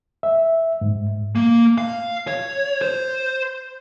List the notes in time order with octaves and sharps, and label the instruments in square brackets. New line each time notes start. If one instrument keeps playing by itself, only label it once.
[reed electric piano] E5
G#2
[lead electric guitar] A#3
F5
C#5
C5